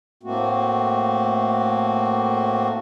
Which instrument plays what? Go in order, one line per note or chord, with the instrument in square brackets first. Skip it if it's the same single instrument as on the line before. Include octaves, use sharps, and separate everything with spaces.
[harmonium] A2 A3 A#3 C4 F#4